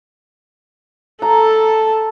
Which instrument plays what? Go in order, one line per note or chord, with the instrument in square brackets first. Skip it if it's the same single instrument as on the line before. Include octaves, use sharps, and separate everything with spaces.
[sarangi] A4 [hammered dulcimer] A#5